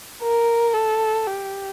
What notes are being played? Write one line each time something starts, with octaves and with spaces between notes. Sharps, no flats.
A#4
A4
G4